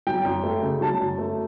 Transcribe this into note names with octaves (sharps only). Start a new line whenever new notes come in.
F#3 G5
F#2
A3
C#3
F#3 A5
F#2
A3